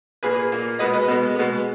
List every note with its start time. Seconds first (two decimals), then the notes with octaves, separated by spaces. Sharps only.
0.23 A#2 A#3 G#4 B4
0.52 A#2 A#3
0.79 B2 G#3 B3 B4 D#5
0.93 B4 D#5
1.08 B2 G#3 B3
1.36 B2 G#3 B3